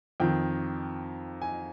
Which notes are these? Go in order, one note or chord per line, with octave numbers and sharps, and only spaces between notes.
F2 D#3 G5
G#5